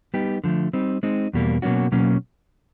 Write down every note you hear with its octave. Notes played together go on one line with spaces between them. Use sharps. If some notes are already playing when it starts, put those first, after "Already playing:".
G3 B3 D#4 G4
D3 F3 A3
G3 C4 D#4
G#3 C4 D#4
E2 B2 G3 A#3
B2 F#3 A#3 C#4 F#4
B2 F#3 A#3 C#4